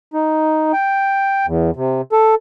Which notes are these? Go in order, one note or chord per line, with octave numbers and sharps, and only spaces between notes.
D#4
G5
E2
C3
A4